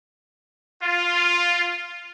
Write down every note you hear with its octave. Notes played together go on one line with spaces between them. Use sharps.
F4